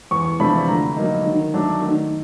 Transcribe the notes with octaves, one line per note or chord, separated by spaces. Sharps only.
E2 C#6
C3 F3 A3 D4 B5
D3 A#5
F#3 A#3 D#4
D#3
F#3 A3 D4
D#3